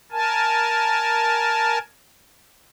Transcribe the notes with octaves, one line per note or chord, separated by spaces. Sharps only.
A#4 G#5 A5